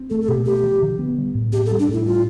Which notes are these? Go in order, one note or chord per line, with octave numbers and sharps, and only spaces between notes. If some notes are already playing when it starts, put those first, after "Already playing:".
Already playing: C4
A3 A4
A4
B2 G4
A3 G4
F3
D3
B3
G3
A2
C4 G4
A4
G3
D4
A2 E4
G3 F4